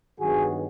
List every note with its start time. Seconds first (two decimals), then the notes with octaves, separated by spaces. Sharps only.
0.19 G2 D#3 F#3 B3 F#4 G#4